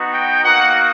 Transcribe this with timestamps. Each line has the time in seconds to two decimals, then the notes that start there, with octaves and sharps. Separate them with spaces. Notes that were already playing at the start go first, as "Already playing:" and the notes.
Already playing: B3 D#4 F#4
0.12 G5
0.44 A#3 D#4 F#4 F#5